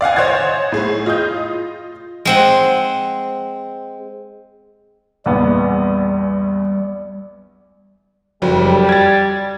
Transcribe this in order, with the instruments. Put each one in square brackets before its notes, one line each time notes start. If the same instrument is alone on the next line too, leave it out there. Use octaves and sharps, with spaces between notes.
[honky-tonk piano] D5 F5 F#5 G#5
C5 C#5 D#5 F#5 G#6 A6
A2 G#4
F4 D#5 D#6 G6
[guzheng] G#3 C4 F#5
[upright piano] A#1 E2 B3 [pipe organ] G3
[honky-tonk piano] F#1 F2 F#3 [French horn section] G3
[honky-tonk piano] G#6 A6